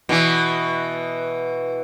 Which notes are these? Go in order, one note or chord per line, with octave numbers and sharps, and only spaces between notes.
B2 E3